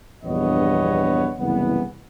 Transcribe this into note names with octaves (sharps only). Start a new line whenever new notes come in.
A#1 E2 G2 B3 C#5 D#5
F#1 C2 E3 B3